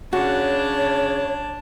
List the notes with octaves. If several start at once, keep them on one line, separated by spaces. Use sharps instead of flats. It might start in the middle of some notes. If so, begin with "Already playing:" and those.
C#3 D4 F#4 C#5 A5